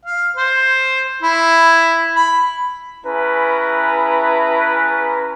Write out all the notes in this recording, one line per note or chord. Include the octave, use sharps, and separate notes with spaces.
F5
C5
E4
B5
C#4 E4 G#4 B4 A5 A#5